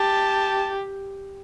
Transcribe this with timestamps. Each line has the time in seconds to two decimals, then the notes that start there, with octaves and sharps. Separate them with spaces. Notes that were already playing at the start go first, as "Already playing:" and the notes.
Already playing: G4 A5